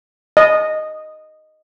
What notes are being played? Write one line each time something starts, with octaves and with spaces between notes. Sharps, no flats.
D#5